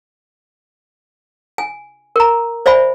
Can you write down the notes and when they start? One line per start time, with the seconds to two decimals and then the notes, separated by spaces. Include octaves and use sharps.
1.58 G#5
2.16 A#4 A#5
2.66 C5 D5 E5 G#5 B5